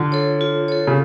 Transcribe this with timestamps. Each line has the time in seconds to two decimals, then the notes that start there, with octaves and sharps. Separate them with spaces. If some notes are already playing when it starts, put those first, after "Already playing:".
Already playing: D3 F4
0.12 A4 C#5
0.41 F4
0.68 A4 C#5
0.87 C#3